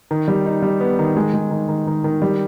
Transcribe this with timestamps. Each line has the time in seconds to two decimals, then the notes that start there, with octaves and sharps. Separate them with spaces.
0.11 D#3
0.28 G3
0.46 D#4
0.62 G3
0.80 B3
0.99 D#3
1.17 G#3
1.34 G#3
1.51 D#3
1.68 D#3
1.87 D#3
2.04 D#3
2.22 G3